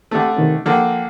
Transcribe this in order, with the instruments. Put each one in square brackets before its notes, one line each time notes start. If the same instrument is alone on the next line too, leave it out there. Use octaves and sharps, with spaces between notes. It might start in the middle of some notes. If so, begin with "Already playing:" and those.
[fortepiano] D3 A3 [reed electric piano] C4 G4
[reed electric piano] C3 D#3 C#4
[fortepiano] D3 A#3 [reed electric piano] F3 G5